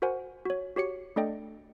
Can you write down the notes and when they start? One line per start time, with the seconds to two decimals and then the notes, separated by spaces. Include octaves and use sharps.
0.02 F#4 A#4 C5 F#5 G#5
0.45 F#4 C#5
0.76 F#4 G4 C#5 C#7
1.16 A3 D4 A4 D5 D#5 G5